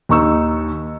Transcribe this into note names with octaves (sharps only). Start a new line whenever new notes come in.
D#2 D#4 C#6 E6